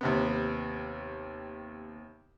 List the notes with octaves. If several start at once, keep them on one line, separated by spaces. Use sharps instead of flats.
D#2 C3 B3